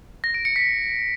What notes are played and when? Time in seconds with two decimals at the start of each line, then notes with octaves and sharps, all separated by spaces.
0.24 A#6
0.34 D7
0.45 C#7
0.56 B6